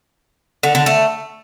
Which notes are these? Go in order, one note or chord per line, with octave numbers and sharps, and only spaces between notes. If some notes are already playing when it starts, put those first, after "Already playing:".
D3
D3
A3